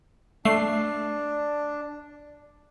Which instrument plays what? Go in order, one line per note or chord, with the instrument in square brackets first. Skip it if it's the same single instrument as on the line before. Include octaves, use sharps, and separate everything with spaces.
[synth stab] A3 C7 [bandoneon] D4